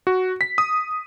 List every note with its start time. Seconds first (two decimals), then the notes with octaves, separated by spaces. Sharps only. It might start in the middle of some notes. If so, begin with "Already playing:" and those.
0.07 F#4
0.41 B6
0.58 D#6